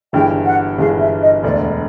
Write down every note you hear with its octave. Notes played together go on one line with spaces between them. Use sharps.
G1 G2 E3 G#3 G5
F#5
G1 G2 E3 G#3 F5
E5
D#5
E1 D2 D3 D5